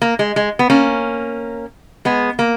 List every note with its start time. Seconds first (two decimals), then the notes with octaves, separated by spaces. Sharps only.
0.02 A#3
0.19 G#3
0.36 G#3
0.59 B3
0.70 A#3 C#4
2.05 G#3 B3
2.39 A#3